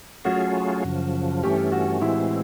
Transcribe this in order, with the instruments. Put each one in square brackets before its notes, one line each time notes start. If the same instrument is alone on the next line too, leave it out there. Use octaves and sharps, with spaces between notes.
[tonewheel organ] F#3 A3 C#4 F4 G#4 [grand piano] F#4
[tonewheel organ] F#2 C#3 F3
[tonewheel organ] G2 E3 A3 C#4 [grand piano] G4
[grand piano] F#4
[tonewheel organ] A2 E3 G#3 C4 [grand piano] E4